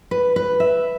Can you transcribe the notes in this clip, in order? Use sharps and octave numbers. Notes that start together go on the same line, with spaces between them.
B4
B4
E5